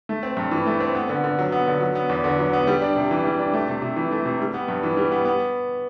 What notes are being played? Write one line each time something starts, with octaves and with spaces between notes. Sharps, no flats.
A3
C4
G2
E3
A3
C4
B3
D3
D3
F#3
B3
D3
F#3
B3
E2
D3
F#3
B3
G3
D4
C3
E3
G3
D4
A3
C3
C3
E3
A3
C3
G3
B3
G2
E3
G3
B3
B3